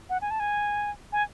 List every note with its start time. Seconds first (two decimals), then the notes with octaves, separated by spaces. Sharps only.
0.10 F#5
0.22 G#5
0.31 A5
0.40 G#5
1.13 G#5